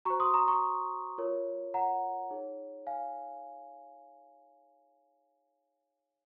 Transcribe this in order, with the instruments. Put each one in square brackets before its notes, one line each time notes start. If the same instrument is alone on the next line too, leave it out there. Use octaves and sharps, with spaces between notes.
[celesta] F#4 A#5 C#6
C5
C6 D#6
A#5 C#6
A#5 C#6
F4 A#4 C#5
F#5 A#5
D#4 G#4 C#5
F5 G#5